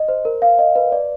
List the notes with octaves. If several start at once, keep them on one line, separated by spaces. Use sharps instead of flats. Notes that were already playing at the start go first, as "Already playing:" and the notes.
Already playing: D#5
C5
A#4
F5
D#5
B4
D5